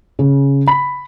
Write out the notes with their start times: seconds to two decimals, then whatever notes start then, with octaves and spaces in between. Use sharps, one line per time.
0.19 C#3
0.68 B5